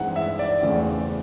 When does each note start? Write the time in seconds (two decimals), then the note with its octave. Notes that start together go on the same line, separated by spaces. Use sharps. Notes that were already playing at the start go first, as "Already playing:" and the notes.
Already playing: G2 E3 G#3 C4 D#4 F#5
0.16 E5
0.39 D5
0.62 E2 C#3 E3 A3 C4